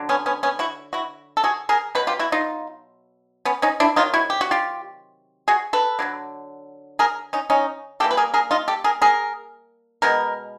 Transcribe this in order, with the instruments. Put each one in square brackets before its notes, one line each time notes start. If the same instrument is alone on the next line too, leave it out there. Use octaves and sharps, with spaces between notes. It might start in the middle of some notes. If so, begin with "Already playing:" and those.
Already playing: [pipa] D3 F#3
B3 C#4
B3 C#4
B3 C#4
E4 F#4
E4 F#4
A4
F#4 G#4
G#4 A#4
B2 F#3 B4
F4 G4
E4 F#4
D#4 F4
B3 C#4
C#4 D#4
D4 E4
C3 D#3 F#3 D#4 F4
E4 F#4
G4
F#4
F4 G4
F#4 G#4
A4 B4
D3 F#3 A#3
G#4 A#4
C#4 D#4
C#4 D#4
E3 G3 A#3 G4 A4
B4
G#4 A#4
G#4 A#4
D#4 F4
G4 A4
G#4 A#4
G#4 A#4
B2 G#3 B3 A#4